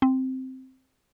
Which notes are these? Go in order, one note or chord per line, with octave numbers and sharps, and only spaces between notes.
C4